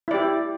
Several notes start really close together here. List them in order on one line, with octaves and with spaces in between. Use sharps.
E4 D5 G4